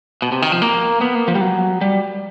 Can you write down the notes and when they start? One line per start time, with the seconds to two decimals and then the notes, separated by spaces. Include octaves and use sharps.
0.22 B2
0.32 C3
0.42 D#3
0.52 F3
0.62 A#3
1.01 B3
1.15 A#3
1.28 F3
1.35 G3
1.41 F#3
1.81 G3